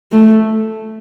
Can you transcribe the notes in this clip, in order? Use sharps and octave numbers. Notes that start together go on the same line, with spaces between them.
A3